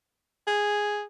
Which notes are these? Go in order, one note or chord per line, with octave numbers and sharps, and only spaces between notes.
G#4